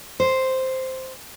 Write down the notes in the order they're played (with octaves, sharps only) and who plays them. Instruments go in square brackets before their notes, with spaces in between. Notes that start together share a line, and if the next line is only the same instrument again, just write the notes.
[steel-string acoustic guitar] C5